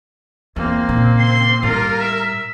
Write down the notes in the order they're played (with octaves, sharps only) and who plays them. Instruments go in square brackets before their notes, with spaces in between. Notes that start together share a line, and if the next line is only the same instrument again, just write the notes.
[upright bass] E2 [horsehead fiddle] A#3 C4
[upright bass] A#2 C#3
[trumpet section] C6
[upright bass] A2 G3 [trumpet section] A#3 F4 [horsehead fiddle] A#4
[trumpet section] E5